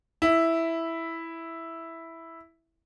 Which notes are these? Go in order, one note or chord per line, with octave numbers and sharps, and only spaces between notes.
E4